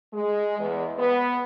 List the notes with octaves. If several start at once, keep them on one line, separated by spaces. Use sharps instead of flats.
G#3
E2
B3